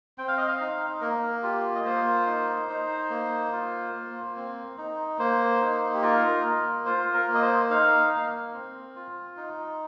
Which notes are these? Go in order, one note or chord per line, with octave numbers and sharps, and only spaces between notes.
C4 G5
F5
D#5
F5
D#4
A#3 A#4
F4 G4
D#5
A#3 C5
D#4
D#4
A#3
F4
A#3
C4
D#4
A#3 C5
D#4
G4
F4 A#4
A#3
F4 C5
A#4
A#3
D#5
C5
D#4 F5
A#3
C4
F4
D#4